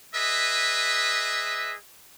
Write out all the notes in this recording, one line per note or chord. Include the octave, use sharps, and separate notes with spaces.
G#4 B4 D#5 E5